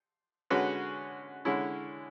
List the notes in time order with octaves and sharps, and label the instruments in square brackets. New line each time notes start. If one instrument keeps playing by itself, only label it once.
[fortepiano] D3 G#3 C#4 F#4 B4
D3 G#3 C#4 E4